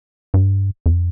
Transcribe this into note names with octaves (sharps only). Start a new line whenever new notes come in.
G2
F2